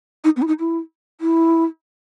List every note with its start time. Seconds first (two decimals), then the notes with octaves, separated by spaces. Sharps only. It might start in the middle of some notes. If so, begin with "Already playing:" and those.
0.24 D#4
0.36 B3
0.42 E4
0.48 D#4
0.60 E4
1.21 E4